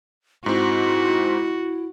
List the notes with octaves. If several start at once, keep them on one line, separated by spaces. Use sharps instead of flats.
G#2 C4 E4 F#4